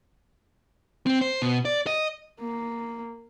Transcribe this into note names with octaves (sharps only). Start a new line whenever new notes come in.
C4
C5
B2
D5
D#5
A#3